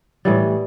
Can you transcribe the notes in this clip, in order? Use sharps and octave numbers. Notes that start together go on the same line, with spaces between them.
A2 E3 G3